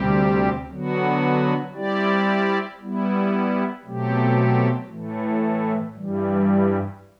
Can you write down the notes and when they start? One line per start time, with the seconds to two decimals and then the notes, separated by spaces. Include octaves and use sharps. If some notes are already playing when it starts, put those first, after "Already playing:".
Already playing: D2 C3 G3 C4 G4
0.70 D3 F#3 B3 F#4
1.75 G3 C4 E4 G4 D5
2.80 G3 B3 E4
3.85 B2 F#3 A3 C4 G4
4.89 A2 E3 A3
5.94 G2 E3 G3